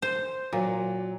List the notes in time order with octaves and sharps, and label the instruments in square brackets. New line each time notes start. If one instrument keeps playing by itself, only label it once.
[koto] C5
[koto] A#2 [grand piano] F#3